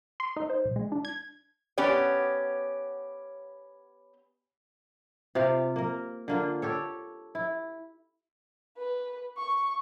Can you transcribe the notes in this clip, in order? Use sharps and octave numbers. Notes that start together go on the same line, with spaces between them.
C6
D#4
C5
B1
G#3
D4
G#6
B3 C#4 G4 D5
C3 F4 G4 F5
A#3 A#4
D3 A#3 F4
G4 A4 C#5
E4
B4
C#6